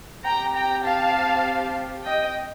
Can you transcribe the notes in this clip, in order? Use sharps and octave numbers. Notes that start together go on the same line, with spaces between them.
C4 G4 G5 A#5
G5 A#5
F5 A5
D#5 G5